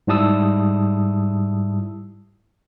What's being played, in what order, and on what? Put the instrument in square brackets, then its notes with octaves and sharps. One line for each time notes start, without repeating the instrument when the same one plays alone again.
[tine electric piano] G#2 G3 E4 A5 D#6 E6